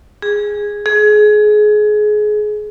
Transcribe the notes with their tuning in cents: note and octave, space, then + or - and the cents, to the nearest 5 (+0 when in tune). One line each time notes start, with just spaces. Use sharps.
G#4 -5
G#4 +25